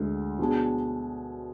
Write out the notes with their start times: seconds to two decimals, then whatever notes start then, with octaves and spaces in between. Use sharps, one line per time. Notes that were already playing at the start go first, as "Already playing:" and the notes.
Already playing: D2 G#3
0.39 B2 F#3 D4 G#4